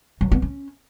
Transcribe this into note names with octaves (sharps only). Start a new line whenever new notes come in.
F#3
B3
C#4